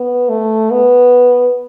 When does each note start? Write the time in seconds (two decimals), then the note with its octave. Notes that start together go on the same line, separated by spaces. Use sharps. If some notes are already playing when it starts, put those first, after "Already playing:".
Already playing: B3
0.29 A3
0.71 B3